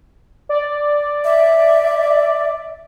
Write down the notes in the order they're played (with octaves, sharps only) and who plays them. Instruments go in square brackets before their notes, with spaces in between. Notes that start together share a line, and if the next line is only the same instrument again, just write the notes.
[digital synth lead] D5
[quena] E5